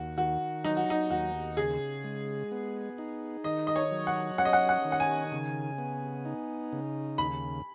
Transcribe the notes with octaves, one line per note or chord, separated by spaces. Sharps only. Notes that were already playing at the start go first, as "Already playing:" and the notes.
Already playing: D#2 F#4
D#3 F#4
F#3 D#4
F#4
D#4
D#2 F#4
C#3 G#4
G#3
B3
D#4
D#3 D#5
D#5
C#5
F#3
F#5
C#4 F#5
D#5
F#5
F#5
D#3
F#5
G#5
C#3
B3
D#4
C#3
D#2 B5